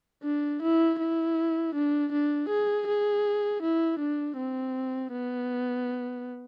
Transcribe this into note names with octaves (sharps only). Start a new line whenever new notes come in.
D4
E4
E4
D4
D4
G#4
G#4
E4
D4
C4
B3